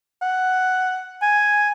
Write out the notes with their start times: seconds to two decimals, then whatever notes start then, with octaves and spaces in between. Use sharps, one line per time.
0.22 F#5
1.22 G#5